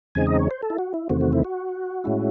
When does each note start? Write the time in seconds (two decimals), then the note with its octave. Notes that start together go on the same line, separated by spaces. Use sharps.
0.15 E2 C#3 G#3 C4 D#4 G#5
0.27 D#5
0.39 C#5
0.51 C5
0.63 A4
0.70 E4
0.78 F#4
0.94 E4
1.09 E2 C3 D#3 A3 C4 F#4
1.21 F#4
1.33 E4
1.44 F#4
2.04 A2 G#3 C#4 E4